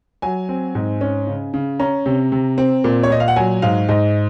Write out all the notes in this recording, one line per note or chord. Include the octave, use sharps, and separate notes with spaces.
F#3 G#5
C4
G#2
C#4
C#3
C#3
C#4 A#5
C3
C3
C4
A#2
C#5
A#2 D#5
F5
F#5
F#3 G#5
G#2 F5
G#2 D#5